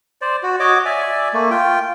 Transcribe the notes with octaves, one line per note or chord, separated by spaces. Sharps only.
C5 D5
F#4
F#4 C#5 D#5 D6
D5 E5 G#5
A3 A#3
F4 G5